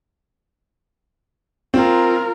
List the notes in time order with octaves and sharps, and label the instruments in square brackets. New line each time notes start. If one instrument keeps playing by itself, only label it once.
[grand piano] C4 [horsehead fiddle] F4 A#4